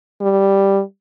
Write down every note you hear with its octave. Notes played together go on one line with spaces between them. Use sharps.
G3